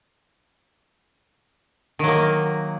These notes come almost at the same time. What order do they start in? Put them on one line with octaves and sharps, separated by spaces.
D#3 F#3 A#3